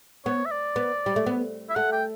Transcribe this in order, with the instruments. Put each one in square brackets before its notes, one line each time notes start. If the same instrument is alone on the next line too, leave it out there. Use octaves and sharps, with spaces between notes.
[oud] B3 [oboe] C#5
[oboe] E5
D5
[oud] B3
G3
A3
B3
[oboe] E5
[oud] A3 [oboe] F#5
[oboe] G5